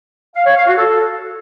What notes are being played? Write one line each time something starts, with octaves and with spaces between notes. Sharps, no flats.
F5
C#5
F5
F#4
A4